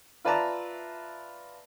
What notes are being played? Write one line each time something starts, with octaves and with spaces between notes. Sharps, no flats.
F4 B4 D5 E5 A5 A#5